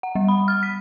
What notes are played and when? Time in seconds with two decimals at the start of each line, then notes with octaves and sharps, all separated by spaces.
0.03 F#5
0.15 G3
0.28 B5
0.48 F6
0.63 B6